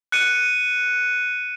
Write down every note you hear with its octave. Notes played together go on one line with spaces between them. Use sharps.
F#6 C#7 D#7